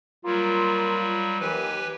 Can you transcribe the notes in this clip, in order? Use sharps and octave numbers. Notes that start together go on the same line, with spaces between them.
F#3 G3 A#3 F4
D#2 E3 G4 B4 G#5